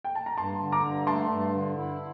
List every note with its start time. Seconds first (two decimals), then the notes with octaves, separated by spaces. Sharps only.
0.04 G5
0.15 A5
0.26 A#5
0.37 G2 A5 C6
0.61 D3
0.72 A#5 D6
0.84 G2
1.06 A3 A5 C6
1.30 G2
1.54 D3
1.77 E4